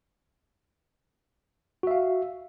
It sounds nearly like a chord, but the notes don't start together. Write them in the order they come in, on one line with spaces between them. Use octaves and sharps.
F#4 E5 F5